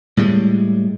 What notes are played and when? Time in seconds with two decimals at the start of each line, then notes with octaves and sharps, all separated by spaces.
0.17 A2 G3 G#3